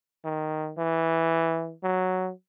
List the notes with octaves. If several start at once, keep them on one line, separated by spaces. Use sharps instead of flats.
D#3
E3
F#3